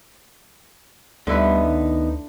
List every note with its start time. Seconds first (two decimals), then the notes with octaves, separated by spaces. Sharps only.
1.27 D2 D3 G3 B3 D#4 E4 B4
1.63 D#3